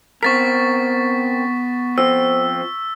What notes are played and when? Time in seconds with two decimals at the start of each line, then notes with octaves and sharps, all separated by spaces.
0.23 B3 C4 A#4 C#6 A6 B6
1.98 F3 C4 E6